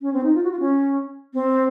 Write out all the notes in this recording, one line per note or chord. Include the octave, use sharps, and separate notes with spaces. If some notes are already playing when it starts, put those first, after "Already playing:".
C#4
C4
D#4
F4
F#4
F4
C#4
C4